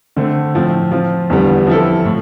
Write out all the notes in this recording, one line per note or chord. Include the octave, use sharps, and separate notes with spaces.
D3 A3 C4
A2 F3 C4
F3 C4 F4
E2 D3 G3 B3
F3 C4 E4 A4
A2